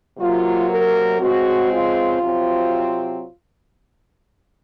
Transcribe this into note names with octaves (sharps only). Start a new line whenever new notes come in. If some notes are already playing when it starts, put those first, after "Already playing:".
C3 F#3 A#3 F4
A#4
C#3 G#3 C4 F#4
F4
C3 F#3 C4